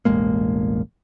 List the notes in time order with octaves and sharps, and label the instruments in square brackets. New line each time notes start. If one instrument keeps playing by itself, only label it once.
[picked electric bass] E1 A1 G#3 A#3